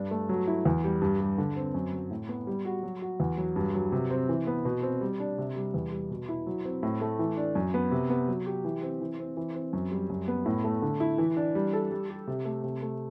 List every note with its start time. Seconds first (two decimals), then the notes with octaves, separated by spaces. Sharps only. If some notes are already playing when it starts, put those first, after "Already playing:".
Already playing: G2 D4
0.11 A3
0.29 F#3
0.47 E4
0.65 E2
0.84 G3
1.02 G2
1.20 G3
1.38 D3
1.56 C4
1.74 F#2
1.93 F#3
2.11 A2
2.29 B3
2.47 G3
2.65 F#4
2.83 F#3
3.02 F#4
3.20 E2
3.38 F#3
3.56 G2
3.74 F#3
3.92 C3
4.11 C4
4.29 E3
4.47 B3
4.65 B2
4.83 C4
5.01 G3
5.20 D4
5.38 C3
5.56 G3
5.74 E2
5.92 G3
6.10 B2
6.29 E4
6.47 F#3
6.65 C4
6.83 A2
7.01 A3
7.19 E3
7.37 D4
7.55 F#2
7.74 B3
7.91 C3
8.10 B3
8.28 F#3
8.46 G4
8.64 E3
8.82 C4
9.01 E3
9.19 C4
9.37 E3
9.55 C4
9.73 F#2
9.92 G3
10.10 F#2
10.28 B3
10.46 A2
10.64 A3
10.82 D3
11.00 E4
11.18 E3
11.37 D4
11.55 G3
11.73 A4
11.91 G3
12.10 G4
12.27 C3
12.45 A3
12.63 C3
12.82 A3